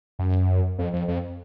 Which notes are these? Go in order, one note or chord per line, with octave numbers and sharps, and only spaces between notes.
F#2
F2
F2
F2